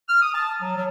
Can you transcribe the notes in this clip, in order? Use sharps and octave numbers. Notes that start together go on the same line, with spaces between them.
F6
D#6
A5
F#3
F#3